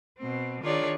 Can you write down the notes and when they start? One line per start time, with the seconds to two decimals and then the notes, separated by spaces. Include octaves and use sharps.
0.18 B2 C4
0.63 D#3 D4 F4 G#4 C#5 D5